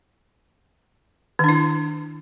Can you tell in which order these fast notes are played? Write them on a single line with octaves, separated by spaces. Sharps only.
D#3 D4 E4